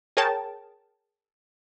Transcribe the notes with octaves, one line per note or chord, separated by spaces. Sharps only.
G#4 A#4 C#5 G5 A5